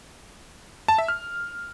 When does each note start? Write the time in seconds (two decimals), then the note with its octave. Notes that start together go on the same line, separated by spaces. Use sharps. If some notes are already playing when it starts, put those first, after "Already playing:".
0.88 A5
0.98 E5
1.08 F6